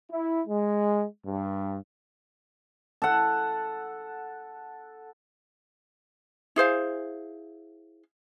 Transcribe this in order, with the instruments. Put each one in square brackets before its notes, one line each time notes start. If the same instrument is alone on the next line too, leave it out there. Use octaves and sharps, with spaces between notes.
[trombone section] E4
G#3
G2
[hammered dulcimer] A4 F#5
[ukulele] E4 G#4 C5 F5